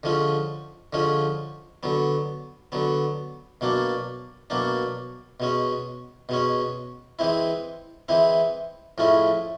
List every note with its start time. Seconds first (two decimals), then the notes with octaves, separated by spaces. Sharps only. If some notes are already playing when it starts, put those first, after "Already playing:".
0.03 D3 F3 G#3 C#4
0.93 D3 F3 G#3 C#4
1.83 D3 F#3 B3
2.72 D3 F#3 B3
3.61 B2 F#3 A#3 D4
4.50 B2 F#3 A#3 D4
5.40 B2 G#3 C#4
6.29 B2 G#3 C#4
7.19 E3 G#3 C4 E4
8.09 E3 G#3 C4 E4
8.98 A2 F3 G#3 C#4 E4